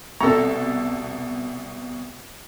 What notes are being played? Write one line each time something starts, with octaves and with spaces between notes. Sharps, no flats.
C2 B2 A4 A#5 C#6